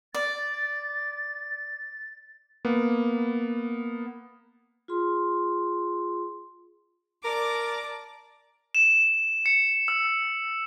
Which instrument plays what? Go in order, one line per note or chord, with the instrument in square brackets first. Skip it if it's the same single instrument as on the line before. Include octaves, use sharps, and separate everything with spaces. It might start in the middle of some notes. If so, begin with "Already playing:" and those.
[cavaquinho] D5 [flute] A6
[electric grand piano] A#3 B3
[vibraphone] F4 G#4 C6
[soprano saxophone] A#4 [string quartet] D5 A5 D6
[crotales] E7
C#7
E6